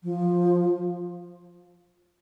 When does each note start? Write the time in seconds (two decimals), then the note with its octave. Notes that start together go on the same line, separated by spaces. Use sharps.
0.04 F3